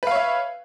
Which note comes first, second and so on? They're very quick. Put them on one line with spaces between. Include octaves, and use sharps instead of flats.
B4 F5 C#5 E5